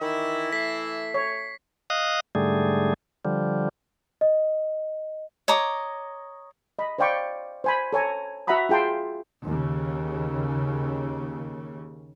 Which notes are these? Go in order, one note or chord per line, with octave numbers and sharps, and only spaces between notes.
D#3 E3 E4 E5
A3 B6 C7
C#5
D#5 F5 D#6 F#6
G#2 D3 G3 A3 G#4
D3 F3 G3
D#5
C#5 D#5 A#5 D6
D#5 B5
C5 D5 F5 G5 B5 C#6
C5 G#5 B5
A4 C#5 G#5 A#5
F#4 E5 F#5 A#5 B5 D#6
F4 G#4 G5 A5 C6
D#2 C#3